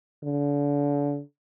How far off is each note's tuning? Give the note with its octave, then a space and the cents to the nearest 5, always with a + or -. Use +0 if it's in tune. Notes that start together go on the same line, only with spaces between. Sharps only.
D3 -35